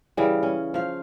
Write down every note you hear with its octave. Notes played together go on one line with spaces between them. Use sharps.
C#3 E3 G3
C#4
F3 F5